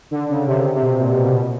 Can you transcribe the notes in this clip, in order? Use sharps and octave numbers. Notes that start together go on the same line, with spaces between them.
D3
C#3
C3
C3
C3
B2
A#2
B2
B2
B2